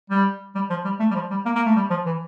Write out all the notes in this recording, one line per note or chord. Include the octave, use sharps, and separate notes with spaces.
G3
G3
F3
G3
A3
G3
F3
G3
A#3
A#3
A3
G3
F3
E3